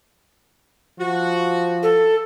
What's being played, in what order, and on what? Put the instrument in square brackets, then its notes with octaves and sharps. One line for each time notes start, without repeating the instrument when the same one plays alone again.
[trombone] F3 [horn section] F#4
[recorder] A4